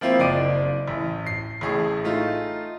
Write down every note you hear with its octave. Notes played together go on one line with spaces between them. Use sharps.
F3 A#3 C4 E4 F4
F#1 D5 D#5 D7 D#7
A1
C7
A1 A2 G#4
A3 D#4 F4